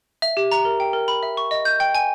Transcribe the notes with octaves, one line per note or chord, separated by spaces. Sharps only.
E5
G4
A#5
A#4
G5
A#4
B5
E5
C#6
D#5
G6
G5
G#5